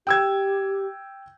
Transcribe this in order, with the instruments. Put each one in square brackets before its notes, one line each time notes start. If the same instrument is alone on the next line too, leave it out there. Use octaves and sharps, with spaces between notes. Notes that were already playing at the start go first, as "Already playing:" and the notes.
[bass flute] G4 [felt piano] G5 E6 G#6